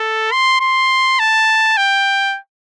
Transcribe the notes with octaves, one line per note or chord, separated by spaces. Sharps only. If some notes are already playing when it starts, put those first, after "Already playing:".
Already playing: A4
C6
C6
A5
G5